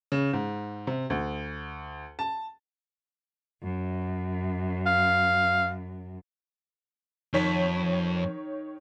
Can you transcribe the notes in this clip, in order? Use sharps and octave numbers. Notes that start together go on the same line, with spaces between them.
C#3
G#2
C3
D2
A5
F#2
F5
F2 D#3 C#5 B6